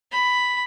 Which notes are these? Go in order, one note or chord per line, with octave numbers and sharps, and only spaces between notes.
B5